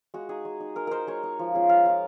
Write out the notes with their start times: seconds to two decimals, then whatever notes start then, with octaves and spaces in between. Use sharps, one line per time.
0.14 G#3 F#4
0.29 D#4 G#4
0.45 G#3
0.60 D#4
0.76 G#3 A#4
0.87 D#4 A#4 C5
1.07 G#3 C#5
1.23 D#4
1.39 F3
1.54 G#3 C#4 F4
1.69 F3 F5
1.85 G#3 C#4 F4 F5